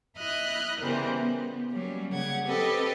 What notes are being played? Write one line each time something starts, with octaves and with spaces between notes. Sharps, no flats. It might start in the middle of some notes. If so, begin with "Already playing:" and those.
E4 D#5 D#6 F6 F#6
C#3 E3 G3 B3 A#4 C5
B3
F#3 G3 A#3 C#4
C#3 F#5 G#6
C4 G4 A4 B4 D#5